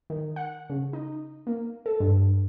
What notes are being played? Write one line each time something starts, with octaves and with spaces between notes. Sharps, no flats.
D#3
F#5
C#3
D#4
A#3
A4
G2